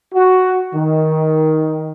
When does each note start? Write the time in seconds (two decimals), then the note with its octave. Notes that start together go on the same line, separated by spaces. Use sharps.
0.14 F#4
0.74 D#3